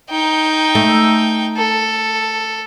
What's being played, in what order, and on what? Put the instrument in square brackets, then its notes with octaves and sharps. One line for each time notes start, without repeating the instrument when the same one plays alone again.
[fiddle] D#4 G5
[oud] A3
[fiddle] A4